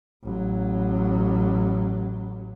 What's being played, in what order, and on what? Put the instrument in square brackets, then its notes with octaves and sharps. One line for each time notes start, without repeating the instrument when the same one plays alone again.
[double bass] A1 F#3